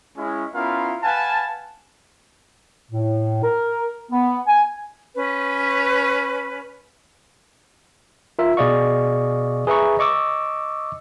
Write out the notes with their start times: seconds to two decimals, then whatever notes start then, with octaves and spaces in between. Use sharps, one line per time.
0.18 G#3 C#4 E4
0.55 B3 C#4 E4 F4 A#4 F5
1.03 B4 F5 F#5 G#5 A5
2.90 A2
3.42 A#4
4.11 B3
4.47 G#5
5.15 C#4 B4
8.39 F4 A#4 E5
8.57 B2 G#4 D5 D#5 F5 C#6
9.67 G#4 B4 E5 A#5 C#6
9.99 D#5 C#6 D6 E6